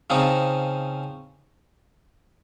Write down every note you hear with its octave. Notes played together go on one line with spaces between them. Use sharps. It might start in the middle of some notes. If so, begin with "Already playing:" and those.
C#3 F3 C4 D#4